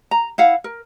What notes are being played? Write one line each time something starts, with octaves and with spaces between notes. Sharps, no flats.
A#5
E4 F5 F#5
A#4